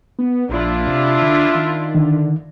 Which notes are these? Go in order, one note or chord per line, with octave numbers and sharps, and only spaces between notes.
B3
A#1 D4 E4 F4
C3
D3
D#3
D3 D#3